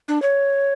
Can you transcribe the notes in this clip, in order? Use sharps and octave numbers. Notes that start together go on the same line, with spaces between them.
D4
C#5